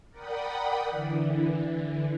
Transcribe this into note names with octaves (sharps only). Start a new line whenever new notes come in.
A#4 D5 F#5 G5 B5 D#6
D3 E3